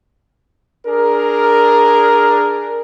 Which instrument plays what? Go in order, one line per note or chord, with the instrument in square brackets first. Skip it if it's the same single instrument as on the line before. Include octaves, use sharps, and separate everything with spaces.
[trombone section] D4 G#4 A#4